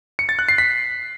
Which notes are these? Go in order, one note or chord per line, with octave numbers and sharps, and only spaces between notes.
C#7
A6
F#6
C7
B6